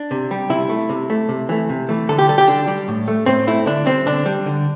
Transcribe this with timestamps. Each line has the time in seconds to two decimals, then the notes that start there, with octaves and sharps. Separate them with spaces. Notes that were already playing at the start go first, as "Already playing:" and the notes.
Already playing: D4
0.11 C3
0.31 G3
0.50 C3 E4
0.69 A3
0.89 C3
1.10 A3
1.29 C3
1.49 E3 A3
1.69 C3
1.89 E3 A3
2.09 D3 A4
2.18 G4
2.28 G3 A4
2.38 G4
2.48 D3 D4
2.67 G3
2.88 A2
3.08 A3
3.26 A2 C4
3.47 A3 E4
3.66 D3 D4
3.86 G3 C4
4.06 D3 D4
4.26 G3
4.46 D3